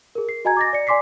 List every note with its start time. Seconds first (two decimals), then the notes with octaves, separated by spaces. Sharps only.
0.15 G#4 A#4
0.29 C7
0.45 F#4 D#5 G#5 A#5 G#6
0.57 D6 A6 A#6
0.73 D5 C#7
0.87 D5 G#5 C6 D6 B6 C7